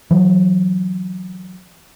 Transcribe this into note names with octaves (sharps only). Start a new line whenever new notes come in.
E3 F#3